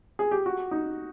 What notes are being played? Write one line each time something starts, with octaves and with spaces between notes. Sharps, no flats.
G#4
G4
F#4
D#4